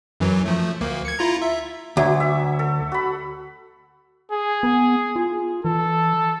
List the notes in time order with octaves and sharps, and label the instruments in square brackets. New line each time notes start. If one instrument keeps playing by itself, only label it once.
[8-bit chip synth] F#2 E3 F#3
F3 A3
D2 A#3
G#6 C#7
E4 F4 A#5
E5
[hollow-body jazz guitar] D2 [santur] F#3
[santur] E5 D6
A4
F#4 B5
[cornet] G#4
[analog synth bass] B3
F4
[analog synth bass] E3 [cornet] A4